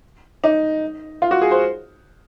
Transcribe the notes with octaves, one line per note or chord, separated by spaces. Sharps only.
D#4
F4
F#4
G#4
C5